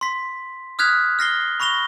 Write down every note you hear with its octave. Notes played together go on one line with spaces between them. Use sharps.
C6 B6
D#6 F6 F#6 G#6 B6 F7
F6 A#6 C7 G7
B5 C#6 A#6 F7 G7